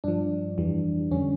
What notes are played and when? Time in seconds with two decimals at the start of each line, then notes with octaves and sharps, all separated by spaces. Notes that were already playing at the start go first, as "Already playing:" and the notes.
0.04 G2 F3 D4
0.58 F2 E3 G3
1.11 F2 D3 G3 C#4